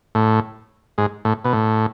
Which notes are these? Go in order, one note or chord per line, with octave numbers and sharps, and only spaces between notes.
A2
G#2
A2
B2
A2